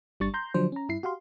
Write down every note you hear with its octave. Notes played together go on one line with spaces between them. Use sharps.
G1 G3 D4 C#6 A6
A#5 C6 G6
D3 F3 F#3 D4 C5
C#4 A#5
G2 E4 C7
F#4 G4 F5 C6